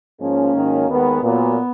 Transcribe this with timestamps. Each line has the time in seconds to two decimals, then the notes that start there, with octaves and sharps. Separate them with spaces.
0.19 G#2 F3 G#3 A#3 C#4
0.54 G#2 D#3 F#3
0.88 D#2 D#3 G#3 B3
1.23 A#2 F#3 B3